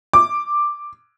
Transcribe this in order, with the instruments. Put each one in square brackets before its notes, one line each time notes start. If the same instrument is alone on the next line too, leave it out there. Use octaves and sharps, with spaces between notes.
[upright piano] D6